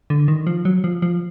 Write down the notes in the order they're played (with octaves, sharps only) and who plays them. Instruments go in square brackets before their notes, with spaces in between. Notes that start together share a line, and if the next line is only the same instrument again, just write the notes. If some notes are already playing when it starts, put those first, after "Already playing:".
[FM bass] D3
D#3
F3
F#3
F3
F3